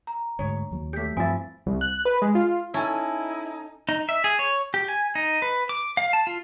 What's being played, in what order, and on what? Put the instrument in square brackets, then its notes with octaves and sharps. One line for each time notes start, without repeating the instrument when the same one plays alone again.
[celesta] A#5
[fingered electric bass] D2 G#2 [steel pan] C#5
[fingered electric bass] D#2 F#3 A#3
[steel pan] A3 G4 [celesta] G6 B6
[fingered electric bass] G2 C4 [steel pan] F3 E4 [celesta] G#5 A6
[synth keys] C2
F#6
B4
G#3
F4
[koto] C#4 [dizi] D#4 [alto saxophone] E4 [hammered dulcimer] A4 G#5
[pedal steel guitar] D#4
E5
G#4
C#5
G4
G#5
D#4
B4
D6
F5
A5
F4